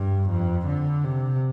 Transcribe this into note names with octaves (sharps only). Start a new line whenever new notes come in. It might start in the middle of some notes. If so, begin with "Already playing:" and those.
Already playing: G2
F2
D3
C3